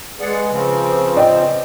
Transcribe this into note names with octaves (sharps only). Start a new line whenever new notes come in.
G#3 G#4 B4 D5 F#5
C#3 F3 C4
D5 D#5 G5